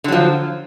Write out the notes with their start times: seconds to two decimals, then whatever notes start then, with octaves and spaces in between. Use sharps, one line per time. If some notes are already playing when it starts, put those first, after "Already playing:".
0.04 D3
0.08 F#3
0.12 F3